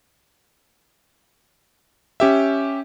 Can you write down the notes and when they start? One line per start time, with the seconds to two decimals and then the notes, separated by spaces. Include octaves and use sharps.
2.20 C#4 G4 E5